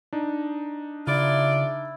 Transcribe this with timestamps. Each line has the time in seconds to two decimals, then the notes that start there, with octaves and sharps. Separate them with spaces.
0.13 D4 D#4
1.07 C#3 E4 F4 D5